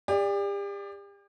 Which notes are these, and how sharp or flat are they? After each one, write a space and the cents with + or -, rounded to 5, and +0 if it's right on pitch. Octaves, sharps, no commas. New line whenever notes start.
G4 +40 D5 +0